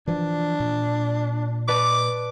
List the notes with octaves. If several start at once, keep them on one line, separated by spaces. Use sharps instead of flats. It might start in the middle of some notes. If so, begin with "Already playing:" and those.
E3 F3 D4
A#2
B4 D5 A5 D6